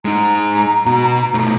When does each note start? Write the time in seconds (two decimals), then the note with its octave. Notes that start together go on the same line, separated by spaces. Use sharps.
0.05 G#3 D#4 A#5
0.86 B2 F#4
1.34 B2 A3